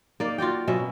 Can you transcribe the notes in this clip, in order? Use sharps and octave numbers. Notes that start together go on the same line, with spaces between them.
A#3 D#4 D5
F4 F#4 D5 G5
B2 F#3 C#4 E5